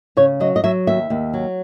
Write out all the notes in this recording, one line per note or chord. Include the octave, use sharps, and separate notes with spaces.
C#3 C#5
F#3 D#5
D#5
F#3 E5
D#2 E5
D#2
F#3